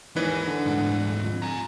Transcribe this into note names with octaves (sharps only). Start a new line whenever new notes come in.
D#2 E3 D#4 B4 D5 G#5
D3
D2 G#2
F2
G#5 A#5